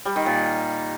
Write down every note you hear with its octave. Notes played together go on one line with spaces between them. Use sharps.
G3
D#3
A#2